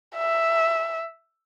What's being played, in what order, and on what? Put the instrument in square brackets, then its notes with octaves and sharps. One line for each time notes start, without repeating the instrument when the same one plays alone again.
[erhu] E5